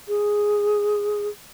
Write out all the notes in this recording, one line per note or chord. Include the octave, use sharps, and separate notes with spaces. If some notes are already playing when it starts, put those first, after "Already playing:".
G#4